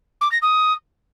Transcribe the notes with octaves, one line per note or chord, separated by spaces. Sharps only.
D6
A#6
D#6